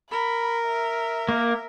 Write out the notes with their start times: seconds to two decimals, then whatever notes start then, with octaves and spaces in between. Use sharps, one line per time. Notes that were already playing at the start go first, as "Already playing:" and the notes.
0.11 A#4 B5
0.67 E5
1.29 A#3